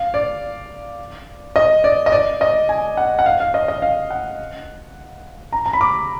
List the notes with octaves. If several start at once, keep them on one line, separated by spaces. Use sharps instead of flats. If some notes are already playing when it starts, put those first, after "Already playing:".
Already playing: F5
D5
D#5
D5
D#5
D5
D#5
G#5
F#5
F#5
F5
F5
D#5
D#5
F5
F#5
A#5
A#5
B5
D6